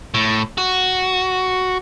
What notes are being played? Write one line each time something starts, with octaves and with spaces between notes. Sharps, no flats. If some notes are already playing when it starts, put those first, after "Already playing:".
A2
F#4